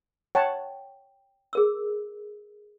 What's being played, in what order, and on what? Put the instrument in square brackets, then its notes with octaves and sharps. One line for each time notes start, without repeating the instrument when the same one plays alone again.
[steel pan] C#5 F#5 A5 [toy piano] G5
[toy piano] G#4 A#4 E6